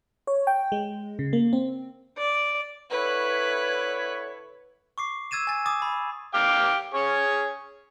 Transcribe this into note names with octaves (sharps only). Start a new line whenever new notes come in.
C#5
G5
G#3
C#3
A#3
C4
D5
D3 E4 B4 C#5
C#6 D6 C7
E6 G#6 A6 D#7 E7
G#5 A6
D6 D#6 A6
B5
F5 G5 D6
G#4 C#5 C#6